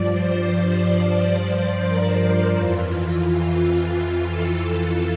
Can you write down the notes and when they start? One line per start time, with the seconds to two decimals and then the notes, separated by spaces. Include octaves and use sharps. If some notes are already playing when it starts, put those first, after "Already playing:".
Already playing: G2 F3 D5
0.13 C5
0.48 C5
1.87 A#4
2.56 F2 E3 F4
4.29 A4
4.64 F4